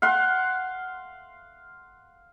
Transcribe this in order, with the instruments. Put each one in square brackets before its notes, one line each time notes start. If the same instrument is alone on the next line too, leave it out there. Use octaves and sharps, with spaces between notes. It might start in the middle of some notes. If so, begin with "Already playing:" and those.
[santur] F5 F#5 C6